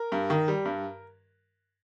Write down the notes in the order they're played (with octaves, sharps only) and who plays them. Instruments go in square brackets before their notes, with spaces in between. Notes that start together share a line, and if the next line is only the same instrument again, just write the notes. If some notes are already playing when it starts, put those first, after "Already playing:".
Already playing: [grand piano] A#4
G2
D#3
G3
G2